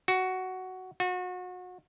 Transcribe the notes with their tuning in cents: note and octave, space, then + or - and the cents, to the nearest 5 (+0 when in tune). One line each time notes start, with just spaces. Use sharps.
F#4 +10
F#4 -30